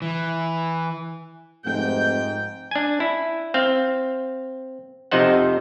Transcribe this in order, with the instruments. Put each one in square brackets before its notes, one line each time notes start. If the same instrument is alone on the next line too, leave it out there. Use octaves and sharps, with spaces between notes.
[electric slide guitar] E3
[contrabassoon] F1 [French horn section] G#2 [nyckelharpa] G5
[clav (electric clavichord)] D4 G#5
E4
C4 F5
F2 C3 F3 D#4 C5 F#5